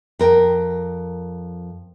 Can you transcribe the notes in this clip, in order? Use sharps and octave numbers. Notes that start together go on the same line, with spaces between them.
F2 A#4 G5